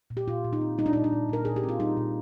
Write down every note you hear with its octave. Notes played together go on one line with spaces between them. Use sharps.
A#2
G4
A#2 F4
A#2
D#4
C4
G3 D#4
D4
A#2 D#4
D4
A#2
A#2 A#4
A#2 G#4
G4
C4
F4
G3 D#4
A#2